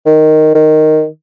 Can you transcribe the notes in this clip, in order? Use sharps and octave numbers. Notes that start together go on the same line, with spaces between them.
D#3
D#3